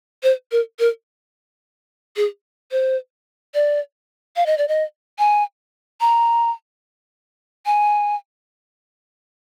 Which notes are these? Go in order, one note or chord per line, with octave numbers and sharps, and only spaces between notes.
C5
A#4
A#4
G#4
C5
D5
F5
D#5
D5
D#5
G#5
A#5
G#5